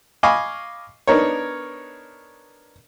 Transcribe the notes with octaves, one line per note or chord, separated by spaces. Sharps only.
D#5 F5 G#5 B5 C#6 D6
B3 D4 D#4 A#4 C#5